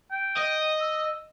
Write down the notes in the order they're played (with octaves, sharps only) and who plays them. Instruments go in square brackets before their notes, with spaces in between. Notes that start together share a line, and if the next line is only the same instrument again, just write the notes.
[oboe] G5
[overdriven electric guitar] D#5
[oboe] E6